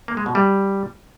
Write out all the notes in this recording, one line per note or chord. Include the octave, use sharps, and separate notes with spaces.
A#3
G#3
B2
G3